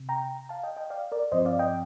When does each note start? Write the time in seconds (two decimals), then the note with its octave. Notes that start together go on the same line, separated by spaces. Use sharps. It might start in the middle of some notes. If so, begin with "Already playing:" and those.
Already playing: C3
0.09 G5 A#5
0.49 F5 A5
0.63 D#5 G5
0.77 D#5 G5
0.90 D5 F5
1.12 A#4 D5
1.32 G2 F3 C4 C5 D#5
1.45 D5 F5
1.59 D#5 G5